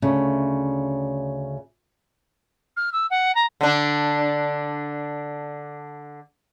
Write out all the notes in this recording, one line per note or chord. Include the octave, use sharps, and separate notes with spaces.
D2 C#3 A3
F6
E6
F#5
A#5
D3 D4